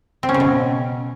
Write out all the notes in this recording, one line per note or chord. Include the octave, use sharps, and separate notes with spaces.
C4
C#4
C#3
B2